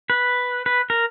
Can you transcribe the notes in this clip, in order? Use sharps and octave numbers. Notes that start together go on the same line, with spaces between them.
B4
B4
A#4